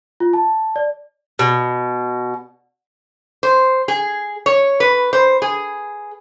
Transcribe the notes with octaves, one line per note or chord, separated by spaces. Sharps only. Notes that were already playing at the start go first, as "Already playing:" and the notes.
F4
A5
D5
B2
C5
G#4
C#5
B4
C5
G#4